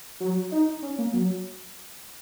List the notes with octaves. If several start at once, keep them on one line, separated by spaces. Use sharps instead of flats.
F#3
D#4
C#4
A#3
F#3